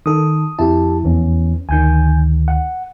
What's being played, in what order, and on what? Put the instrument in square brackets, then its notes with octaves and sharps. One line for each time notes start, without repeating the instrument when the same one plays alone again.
[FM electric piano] D#3 A4 [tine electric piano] D#6
[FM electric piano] F2 E4 [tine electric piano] G4 A5
[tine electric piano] E2 E3 C#4
[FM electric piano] D2 D#3 [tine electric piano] G#5 G6
[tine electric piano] F#5